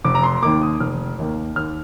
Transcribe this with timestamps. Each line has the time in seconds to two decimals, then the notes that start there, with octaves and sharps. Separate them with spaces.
0.04 F1 D6
0.15 A#5
0.23 C6
0.42 D#2 D#3 A#3 D6
0.62 D#6
0.80 F1 F6
1.18 D#2 D#3 A#3
1.56 D#2 F6